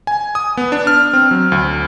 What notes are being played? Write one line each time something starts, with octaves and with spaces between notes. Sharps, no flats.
G#5
D#6
B3
D4
F6
C4
F#3
D2